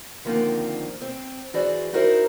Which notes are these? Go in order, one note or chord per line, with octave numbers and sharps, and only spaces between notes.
D3 D#3 F3 A#3 C4
C4
E3 F#4 G#4 C5 D5
D#4 E4 F#4 A#4 C5